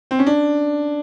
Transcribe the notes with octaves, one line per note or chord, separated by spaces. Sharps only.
C4
C#4
D4